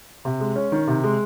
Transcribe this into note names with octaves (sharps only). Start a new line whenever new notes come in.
C3
G#3
C#4
D#3
C3
G#3